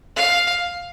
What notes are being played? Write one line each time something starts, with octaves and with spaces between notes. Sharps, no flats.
F5